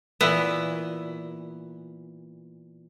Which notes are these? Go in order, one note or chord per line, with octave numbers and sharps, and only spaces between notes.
A#2 E3 B3